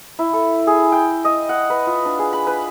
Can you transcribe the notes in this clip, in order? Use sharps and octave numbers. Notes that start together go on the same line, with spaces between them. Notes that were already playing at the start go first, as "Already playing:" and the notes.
E4
A4
G#4
G5
D#5
F#5
B4
F4
D4
G#4
B5
B4